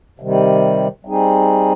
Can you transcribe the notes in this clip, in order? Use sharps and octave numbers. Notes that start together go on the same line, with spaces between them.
C3 D#3 G3
G3 C4 D#4 G#4